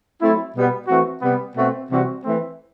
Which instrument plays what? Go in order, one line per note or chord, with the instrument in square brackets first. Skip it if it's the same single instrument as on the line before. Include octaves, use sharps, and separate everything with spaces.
[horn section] F#3 A3 C4 E4
B2 G3 B3
E3 A3 C4 F#4
C3 G3 B3
B2 A3 C4 F#4
C3 E3 G3 C4 F#4
E3 A3 C4